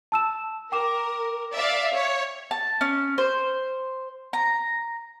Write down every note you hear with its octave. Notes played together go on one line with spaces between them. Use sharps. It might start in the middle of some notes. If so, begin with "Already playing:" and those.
A5 E6 E7
A#4 G5 D6 E7
D5 E5 F5
C#5
A5
C#4
C5
A#5